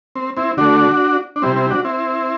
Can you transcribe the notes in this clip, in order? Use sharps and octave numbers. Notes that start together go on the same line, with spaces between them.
C4
C4 E4
D3 A3 D4 F#4
D4
C3 G3 C4 E4
C4 E4
D4 F#4
C4 E4